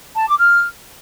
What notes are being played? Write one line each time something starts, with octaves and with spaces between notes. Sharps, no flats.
A5
D6
F6